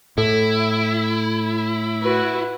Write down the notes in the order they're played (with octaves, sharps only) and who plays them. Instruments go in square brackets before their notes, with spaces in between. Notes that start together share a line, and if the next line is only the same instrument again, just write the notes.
[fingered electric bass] A2 [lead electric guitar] E4 [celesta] A4
[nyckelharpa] F#4 B4